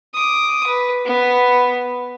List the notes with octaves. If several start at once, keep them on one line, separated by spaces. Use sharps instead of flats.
D6 D#6
B4
B3 B4